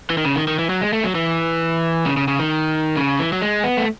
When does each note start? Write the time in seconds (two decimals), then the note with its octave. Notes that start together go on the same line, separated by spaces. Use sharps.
0.10 E3
0.17 D#3
0.25 C#3
0.36 D#3
0.47 D#3
0.59 E3
0.69 F#3
0.81 G#3
0.93 A3
1.04 F#3
1.15 E3
2.06 C#3
2.17 C#3
2.28 C#3
2.40 D#3
2.97 C#3
3.19 E3
3.33 F#3
3.42 G#3
3.64 B3
3.77 A3